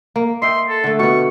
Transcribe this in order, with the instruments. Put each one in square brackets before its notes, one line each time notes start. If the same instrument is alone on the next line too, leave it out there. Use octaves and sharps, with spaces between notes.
[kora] A#3
[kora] D#5 E5 G5 [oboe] C6
[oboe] A4
[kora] D3 A3
[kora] B2 B3 [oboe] C#6